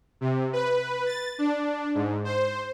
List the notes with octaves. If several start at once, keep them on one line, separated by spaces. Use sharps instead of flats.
C3
B4
A6
D4
G#2
C5